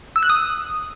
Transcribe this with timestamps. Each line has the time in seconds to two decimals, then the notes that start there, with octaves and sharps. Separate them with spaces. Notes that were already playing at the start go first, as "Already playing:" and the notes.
0.16 E6
0.23 F#6
0.29 D#6